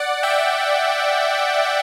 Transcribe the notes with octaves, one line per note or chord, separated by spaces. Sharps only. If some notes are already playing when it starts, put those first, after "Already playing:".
Already playing: D5 F#5
E5 G5